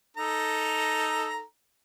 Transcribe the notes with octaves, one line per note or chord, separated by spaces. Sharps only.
D#4 A4 A#5